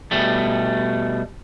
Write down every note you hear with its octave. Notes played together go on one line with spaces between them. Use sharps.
B2 G3 A3